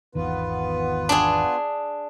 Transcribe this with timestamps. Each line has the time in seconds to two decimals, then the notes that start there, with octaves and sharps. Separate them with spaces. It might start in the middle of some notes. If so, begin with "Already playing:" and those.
0.15 G#1 E2 D#3 B3 F4 B4
1.09 D4 G#4